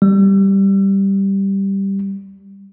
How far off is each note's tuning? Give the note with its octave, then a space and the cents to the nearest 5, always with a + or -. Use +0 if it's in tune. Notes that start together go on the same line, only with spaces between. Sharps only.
G3 +0